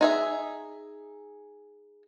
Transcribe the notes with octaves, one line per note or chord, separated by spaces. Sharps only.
D#4 G#4 E5